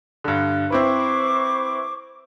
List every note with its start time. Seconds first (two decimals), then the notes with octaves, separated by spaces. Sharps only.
0.24 G2 D3
0.70 C4 E4 B4 C5 C#6 D6